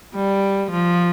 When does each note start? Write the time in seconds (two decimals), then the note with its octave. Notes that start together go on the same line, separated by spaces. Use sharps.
0.15 G3
0.71 F3